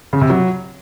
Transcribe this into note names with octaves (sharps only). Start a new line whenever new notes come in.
C#3
C3
F#3